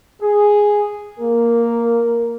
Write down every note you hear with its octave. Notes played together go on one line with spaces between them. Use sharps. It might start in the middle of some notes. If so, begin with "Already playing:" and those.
G#4
A#3 A#4